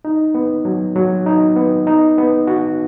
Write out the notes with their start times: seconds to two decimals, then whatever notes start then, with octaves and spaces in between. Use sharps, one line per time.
0.05 D#4
0.35 B3
0.65 F#3
0.95 F#3
1.26 D#4
1.56 B3
1.87 D#4
2.18 B3
2.47 F#4